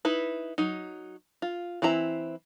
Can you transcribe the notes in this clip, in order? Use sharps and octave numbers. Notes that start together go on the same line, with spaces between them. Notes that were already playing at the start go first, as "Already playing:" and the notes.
D#4 E4 B4
F#3 D#4
F4
E3 C4 E4 A#5